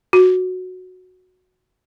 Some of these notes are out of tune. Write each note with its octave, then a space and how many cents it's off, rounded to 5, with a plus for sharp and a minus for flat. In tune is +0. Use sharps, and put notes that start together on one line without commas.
F#4 -10